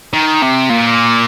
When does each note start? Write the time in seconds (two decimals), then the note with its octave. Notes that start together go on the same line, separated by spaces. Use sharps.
0.13 D#3
0.42 C3
0.70 A#2